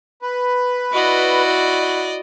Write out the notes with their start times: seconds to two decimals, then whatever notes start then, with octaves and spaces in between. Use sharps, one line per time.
0.22 B4
0.93 E4 F#4 D5 D#5